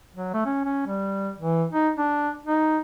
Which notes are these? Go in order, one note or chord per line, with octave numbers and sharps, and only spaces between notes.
F#3
A3
C#4
C#4
G3
E3
D#4
D4
D#4